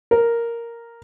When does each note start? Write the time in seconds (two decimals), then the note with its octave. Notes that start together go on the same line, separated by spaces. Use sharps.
0.11 A#4